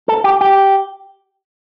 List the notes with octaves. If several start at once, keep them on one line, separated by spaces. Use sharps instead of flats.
A4
G4
G4